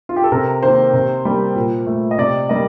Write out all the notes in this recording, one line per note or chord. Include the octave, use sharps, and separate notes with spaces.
F4
G4
A4
C3 A#4
D#3 A#3 C5
C3
G3 A#3
A#2
A3
D#5
C3 D5
G3 A#3 D#5